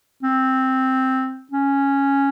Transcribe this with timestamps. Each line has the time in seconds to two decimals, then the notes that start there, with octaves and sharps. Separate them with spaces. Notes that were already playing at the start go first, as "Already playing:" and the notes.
0.23 C4
1.52 C#4